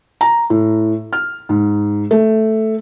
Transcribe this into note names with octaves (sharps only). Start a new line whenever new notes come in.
A#5
A2
F6
G#2
A3